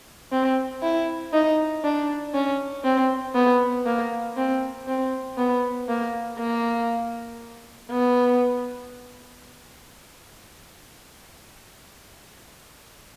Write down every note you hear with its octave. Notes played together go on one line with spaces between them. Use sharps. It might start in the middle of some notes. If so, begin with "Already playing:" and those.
C4
E4
D#4
D4
C#4
C4
B3
A#3
C4
C4
B3
A#3
A#3
B3